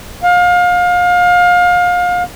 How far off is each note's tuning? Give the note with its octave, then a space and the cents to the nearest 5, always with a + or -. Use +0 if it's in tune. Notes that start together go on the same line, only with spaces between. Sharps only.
F5 +30